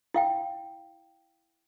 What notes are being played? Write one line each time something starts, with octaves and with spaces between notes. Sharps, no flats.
E4 F5 G5